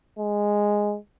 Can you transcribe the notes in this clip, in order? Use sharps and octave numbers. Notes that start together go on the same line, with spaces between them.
G#3